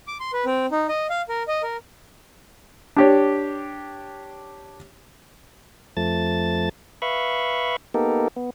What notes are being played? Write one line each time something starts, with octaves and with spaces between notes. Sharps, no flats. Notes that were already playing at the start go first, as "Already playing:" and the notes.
D6
C6
B4
C4
D#4
D#5
F5
A#4
D#5
A#4
D4 G4 C#5
F2 F3 A3 A5 A6
B4 E5 F5 B5 C#6
A#3 B3 D#4 G4 A4 A#4
B3